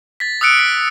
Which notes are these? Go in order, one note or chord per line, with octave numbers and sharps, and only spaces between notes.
A6 B6
D#6 E6 F#6 C#7 D7
B6